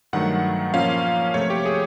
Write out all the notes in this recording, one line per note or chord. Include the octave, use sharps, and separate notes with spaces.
G2 D#3 F#3 A3 F#5
A#2 F3 A#3 C#4 F4 F5
C3 F3 A3 C#5
G4
G#4